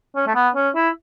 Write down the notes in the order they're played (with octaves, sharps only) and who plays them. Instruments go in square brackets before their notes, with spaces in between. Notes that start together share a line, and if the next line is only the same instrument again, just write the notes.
[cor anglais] C#4
A3
B3
C#4
E4